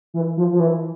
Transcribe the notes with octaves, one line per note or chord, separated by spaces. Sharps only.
E3
F3
F3
E3